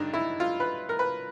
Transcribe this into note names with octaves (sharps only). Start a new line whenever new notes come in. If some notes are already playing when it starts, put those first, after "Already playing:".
Already playing: G2 D3 D4 D#4
E4
F4
B4
A#4
B4